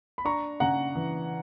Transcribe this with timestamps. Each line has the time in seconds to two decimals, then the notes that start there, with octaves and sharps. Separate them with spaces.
0.18 B5
0.25 D4 A#5 C#6
0.60 C#3 F#5 A#5
0.95 E3